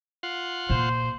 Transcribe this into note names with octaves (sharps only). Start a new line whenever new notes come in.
F4 F#5 C6
A#2 C5